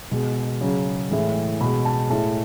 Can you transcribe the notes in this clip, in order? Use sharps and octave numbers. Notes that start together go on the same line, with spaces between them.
B2 G#3
C#3 F#3
A2 E3 G#3
B2 G#3 B5
A5
A2 G#3 A5